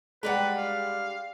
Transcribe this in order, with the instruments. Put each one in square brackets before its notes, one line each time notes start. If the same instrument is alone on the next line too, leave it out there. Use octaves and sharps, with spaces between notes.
[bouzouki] G3 D4 A#5 [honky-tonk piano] G#3 D5 F#5 [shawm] B4
[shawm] F5